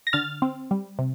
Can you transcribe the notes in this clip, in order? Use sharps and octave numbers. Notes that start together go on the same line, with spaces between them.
A#6
D3 F6 A6
C4
G3
C3